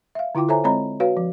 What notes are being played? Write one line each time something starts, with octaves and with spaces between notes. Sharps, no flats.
E5 F5
D3 E4 F4 G5 D6
A4 C5 C#5 E5 G#5 A#5
G#3 C4 C#5 D#5 A#5 B5
F#4 B4 C#5 F5
F3